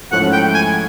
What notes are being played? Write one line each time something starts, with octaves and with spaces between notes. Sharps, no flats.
G#2 F3 A3 C#4 E4 F#5
G5
G#5